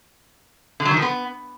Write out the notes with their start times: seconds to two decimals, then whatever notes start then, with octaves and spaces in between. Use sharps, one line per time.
0.80 D3
0.85 F#3
0.91 D#3
0.97 F3
1.02 B3